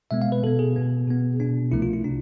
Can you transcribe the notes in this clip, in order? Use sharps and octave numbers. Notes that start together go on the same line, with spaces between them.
B2 G#3 B3 E5
F5
B4
B2 B3 A4
G#4
B2 B3
B2 B3
B2 B3 D4
C2 C3 F3 A3 E4
F4
E4
C3 D4